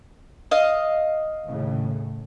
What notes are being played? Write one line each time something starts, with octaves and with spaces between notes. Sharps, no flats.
D#5 F5
D#2 A2 C#3